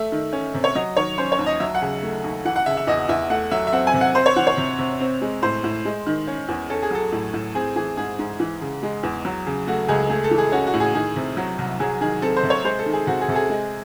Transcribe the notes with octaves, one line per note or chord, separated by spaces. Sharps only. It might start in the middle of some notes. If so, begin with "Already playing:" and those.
Already playing: A3 E5
D#3
C#4
C3
C#5
F#3 D#5
D#3 C#5
C#4 C5
C#5
D#2
D#5
F#3 E5
F#5
C#3
A3
D#2
E3 F#5
F#5
C#3 E5
E5
E2 D#5
E2 E5
A3 F#5
F#3 E5
E5
C4 F#5
G#5
C3
F#5
C4 C5
C#5
E3 F#5
C#5
C3
C3
C4
G#3
A2 C5
A2
G#3
D#3
C#4
E2
C#4 A4
G#4
F#3 A4
A2
A2
C4 G#4
E3 G#4
G#2 G#4
G#2
E3
C#3
G#3
E2
F#3
C#3
A3 F#4
C#2 G#4
A3 G#4
A4
E3
G#4
C#4 F#4
F#4
A2
G#4
D#3 G#4
C3
F#3
C2
F#3 G#4
D#3 G#4
C4 A4
C5
C3
C#5
G#3 C5
A4
D#3
G#4
C3 F#4
G#4
C3 A4
G#4
G#3